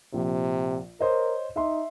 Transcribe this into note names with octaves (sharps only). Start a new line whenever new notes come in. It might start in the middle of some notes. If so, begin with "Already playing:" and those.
A#1 C3
A#4 C5 C#5 D#5
D#4 E5 C6